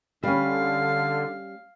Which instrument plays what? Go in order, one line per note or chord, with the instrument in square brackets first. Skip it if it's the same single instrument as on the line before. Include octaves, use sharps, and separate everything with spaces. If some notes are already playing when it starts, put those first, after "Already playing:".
[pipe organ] D3 [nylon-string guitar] G3 C#4 [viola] F5